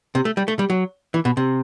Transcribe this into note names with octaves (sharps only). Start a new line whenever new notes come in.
C3
A3
G3
A3
G3
F#3
E3
B2
C3